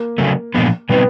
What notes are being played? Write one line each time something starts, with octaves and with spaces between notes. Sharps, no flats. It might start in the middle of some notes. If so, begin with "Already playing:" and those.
Already playing: A#3
C#3 F#3 A3
A#2 F3 G#3 B3 D4
B2 G3 B3 C4 D#4